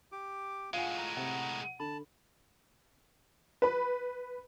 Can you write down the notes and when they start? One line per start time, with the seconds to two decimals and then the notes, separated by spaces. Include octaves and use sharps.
0.12 G4 D6
0.74 A2 G#3 F4 F5 F#5 G#5
0.98 A#5
1.17 C3 F#5
1.80 D3 A5 B5
3.62 B4 B5